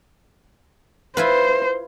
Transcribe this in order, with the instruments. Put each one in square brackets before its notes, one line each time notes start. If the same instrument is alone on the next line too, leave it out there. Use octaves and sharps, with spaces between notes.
[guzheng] E4 F4 B4 [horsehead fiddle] C5